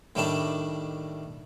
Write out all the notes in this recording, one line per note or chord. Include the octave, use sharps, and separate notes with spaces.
A2 D#3 G3 A3 D4 A5